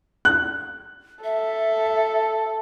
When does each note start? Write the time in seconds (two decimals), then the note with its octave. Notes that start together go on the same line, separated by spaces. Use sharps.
0.25 F#6
1.24 A4 E5